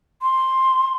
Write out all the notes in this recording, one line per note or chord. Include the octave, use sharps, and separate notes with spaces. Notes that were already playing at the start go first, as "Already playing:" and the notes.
C6